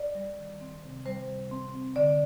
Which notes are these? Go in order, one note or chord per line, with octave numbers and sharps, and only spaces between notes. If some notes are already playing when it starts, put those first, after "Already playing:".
Already playing: D5
G3
D#3
C4
C3
G3 C5
C3
C4
C4
D3 D5